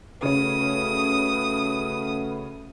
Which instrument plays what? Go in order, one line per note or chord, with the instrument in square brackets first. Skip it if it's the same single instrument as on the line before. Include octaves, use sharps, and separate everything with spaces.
[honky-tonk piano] C#3 C#4 [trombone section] A3 F#4 B4 [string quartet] D#6